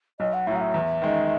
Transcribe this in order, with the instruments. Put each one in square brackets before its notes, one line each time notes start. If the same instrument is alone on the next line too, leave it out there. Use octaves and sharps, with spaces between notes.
[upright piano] B1 [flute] D#5
[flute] F#5
[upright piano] A2 F#3 [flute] E5
[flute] F#5
E5
[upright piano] E2
D#3 G#3 D#4